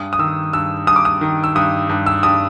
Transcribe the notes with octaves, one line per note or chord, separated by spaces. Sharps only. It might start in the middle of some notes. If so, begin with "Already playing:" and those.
Already playing: G2 D#6
D#6
D#3 E6
G2 E6
G2 D#6
D6
D#6
D#3
E6
G2 D#6
G2
E6
G2 D#6